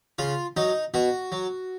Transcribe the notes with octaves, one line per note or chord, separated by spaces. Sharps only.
C#3 F4
F#3 D#4
B2 F#4
F#3